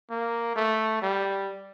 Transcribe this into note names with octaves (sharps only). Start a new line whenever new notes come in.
A#3
A3
G3